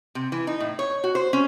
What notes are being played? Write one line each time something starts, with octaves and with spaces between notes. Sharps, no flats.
C3
E3
D#4
A2
C#5
F#4
C5
C#4